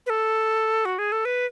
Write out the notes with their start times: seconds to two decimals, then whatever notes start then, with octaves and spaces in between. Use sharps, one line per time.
0.06 B4
0.10 A4
0.85 F#4
0.99 G#4
1.12 A4
1.25 B4